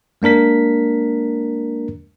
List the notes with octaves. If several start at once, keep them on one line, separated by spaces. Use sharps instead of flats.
G#3 A#3 D4 A#4 B6